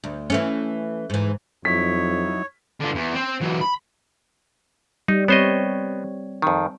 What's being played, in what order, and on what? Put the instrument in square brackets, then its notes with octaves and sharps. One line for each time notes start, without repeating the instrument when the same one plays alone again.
[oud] D2
E3 A3 C#4
G#2 E3
[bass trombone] F2 [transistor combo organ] F#3 D#4 E4 [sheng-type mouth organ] C#5 [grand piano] B6
[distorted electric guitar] D3 F4
E2
C4 C5
E3 F#3
B5
[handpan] G3 [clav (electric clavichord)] D#4
[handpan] G3 C4 C#5 [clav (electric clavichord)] B3 C5 D#5
[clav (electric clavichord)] F2 D#3